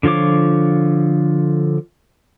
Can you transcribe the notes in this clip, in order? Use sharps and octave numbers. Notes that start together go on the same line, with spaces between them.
D3 F3 F4 C#5 D6